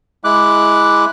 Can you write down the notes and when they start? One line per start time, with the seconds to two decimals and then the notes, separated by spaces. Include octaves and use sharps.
0.24 G#3 E4 D6 F#6